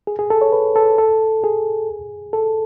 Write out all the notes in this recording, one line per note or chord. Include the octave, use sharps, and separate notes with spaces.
G#4
G#4
A4
C#5
B4
A4
A4
G#4
A4